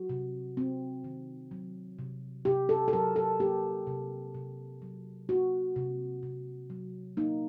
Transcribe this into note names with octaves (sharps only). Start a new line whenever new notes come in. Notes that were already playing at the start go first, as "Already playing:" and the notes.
Already playing: F#3 F#4
C3
C4
D#3
F#3
C3
C3 G4
A4
A4
F#3 A#4
A4
A#3 G4
C3
C3
F#3
A#3 F#4
C3
C3
F#3
A#3 D#4